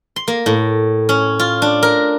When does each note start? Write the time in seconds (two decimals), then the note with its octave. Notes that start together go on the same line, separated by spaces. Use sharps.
0.16 C6
0.28 A#3
0.46 A2
1.09 C#4
1.39 F4
1.62 D4
1.83 A#4